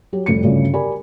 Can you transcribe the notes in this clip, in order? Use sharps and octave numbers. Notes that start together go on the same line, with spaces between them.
F#3 G4
F1 G3 C#7
D2 G2 C#3 F3 D5
G4 A#4 D5 G#5 B5